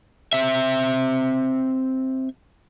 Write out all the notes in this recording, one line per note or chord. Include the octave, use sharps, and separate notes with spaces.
C4 E5